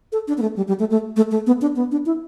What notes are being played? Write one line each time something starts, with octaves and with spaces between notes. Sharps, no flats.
A4
D4
B3
A3
G3
G3
A3
A3
A3
A3
B3
D4
B3
D4
E4